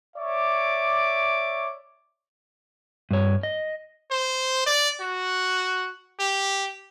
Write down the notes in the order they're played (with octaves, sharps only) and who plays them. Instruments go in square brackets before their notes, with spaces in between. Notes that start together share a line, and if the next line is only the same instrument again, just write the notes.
[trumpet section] C#5 D5 E5 D6
[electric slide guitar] G2 C#5
D#5
[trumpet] C5
D5
F#4
G4